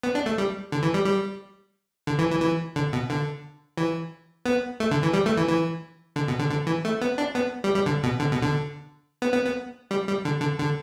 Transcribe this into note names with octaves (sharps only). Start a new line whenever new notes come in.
B3
D4
A3
G3
D3
E3
G3
G3
D3
E3
E3
E3
D3
B2
D3
E3
B3
A3
D3
E3
G3
A3
E3
E3
D3
B2
D3
D3
E3
A3
B3
D4
B3
G3
G3
D3
B2
D3
B2
D3
B3
B3
B3
G3
G3
D3
D3
D3